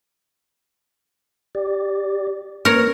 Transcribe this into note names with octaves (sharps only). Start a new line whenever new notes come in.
G4 D5
A#3 C#4 A#4 B4 C#5